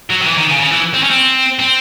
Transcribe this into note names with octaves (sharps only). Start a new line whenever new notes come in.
F#3
D#3
E3
D#3
C#3
C#3
E3
C4
C#4
C4
C4